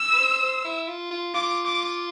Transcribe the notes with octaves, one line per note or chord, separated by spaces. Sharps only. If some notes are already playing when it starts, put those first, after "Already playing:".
Already playing: E6
B4
C5
C5
E4
F4
F4
F4 D6
D6